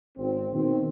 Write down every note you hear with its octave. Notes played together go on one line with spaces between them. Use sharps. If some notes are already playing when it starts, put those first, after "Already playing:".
G#1 C4
B2 D#3 C4